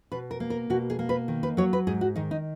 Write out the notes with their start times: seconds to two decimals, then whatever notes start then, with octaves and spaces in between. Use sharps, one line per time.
0.12 B2 B4
0.31 A#4
0.40 A#3
0.50 A#4
0.70 B2 F#4
0.90 G#4
0.99 A#3
1.09 B4
1.28 D#3
1.43 B4
1.57 F#3 C#5
1.73 B4
1.87 G#2 G#4
2.01 F#4
2.16 D#3 D#4
2.31 D#4